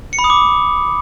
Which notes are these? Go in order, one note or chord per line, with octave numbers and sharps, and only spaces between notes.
C#7
B5
D#6
D6